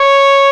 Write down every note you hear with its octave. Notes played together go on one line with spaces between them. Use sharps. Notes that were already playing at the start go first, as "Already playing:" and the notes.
Already playing: C#5